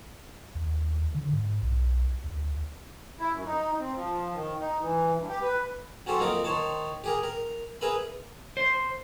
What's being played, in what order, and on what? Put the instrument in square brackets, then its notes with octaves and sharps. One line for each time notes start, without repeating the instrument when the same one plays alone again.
[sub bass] D#2
D3
G#2
B1
D2
[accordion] E4
F#2
D#4
C4
F3
D#3
D#4
E3
G2
G4
B4
[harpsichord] F#3 C#4 G4 A4 C5
F2 A#3 C4 D#4 A#4 D6
D#3 C5 C#5 A5
G4 G#4 A#4
A#4
G#4 A#4 B4 E5 B5
[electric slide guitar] C5